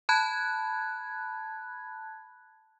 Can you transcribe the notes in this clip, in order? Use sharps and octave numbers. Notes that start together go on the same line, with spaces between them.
A5 B5 F#6 G#6